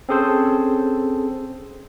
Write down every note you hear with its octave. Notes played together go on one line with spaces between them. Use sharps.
C4 C#4 G#4 A4 C5